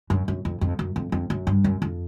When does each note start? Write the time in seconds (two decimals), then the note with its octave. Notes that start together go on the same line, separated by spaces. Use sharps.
0.10 F#2
0.28 F#2
0.45 F2
0.61 F2
0.79 F#2
0.96 F2
1.12 F2
1.30 F#2
1.47 G2
1.64 F#2
1.82 F2